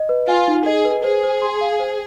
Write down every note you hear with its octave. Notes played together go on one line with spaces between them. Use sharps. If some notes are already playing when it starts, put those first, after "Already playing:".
Already playing: D#5
B4
F4 G#5
D#4
G#4 D#5
B4
G#4 C5
C5
C6
F5
C5